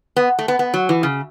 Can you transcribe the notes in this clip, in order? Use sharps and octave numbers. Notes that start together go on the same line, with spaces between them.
B3
A3
B3
B3
F#3
E3
C#3